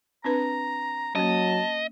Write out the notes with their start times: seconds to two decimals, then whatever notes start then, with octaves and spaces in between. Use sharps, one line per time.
0.24 C4 D4 B4 A#5
1.15 F#3 A#3 C#4 D#5 A5